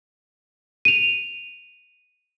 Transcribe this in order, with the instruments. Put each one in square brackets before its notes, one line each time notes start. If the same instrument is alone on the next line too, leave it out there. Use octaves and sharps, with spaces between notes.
[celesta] D#7 F7